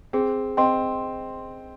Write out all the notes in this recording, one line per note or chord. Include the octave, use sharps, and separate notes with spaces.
C4 G#4
C4 D#5 G5 C6